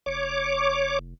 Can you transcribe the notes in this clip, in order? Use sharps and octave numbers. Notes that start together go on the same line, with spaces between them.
F1 C#5 D6